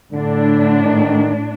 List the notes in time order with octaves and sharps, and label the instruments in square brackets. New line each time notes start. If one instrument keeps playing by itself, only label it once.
[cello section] A2 D4 [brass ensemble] D3
[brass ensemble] G#2 D3 D#3